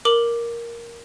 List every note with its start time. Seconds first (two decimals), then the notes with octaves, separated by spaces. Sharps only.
0.05 A#4 D6 F#7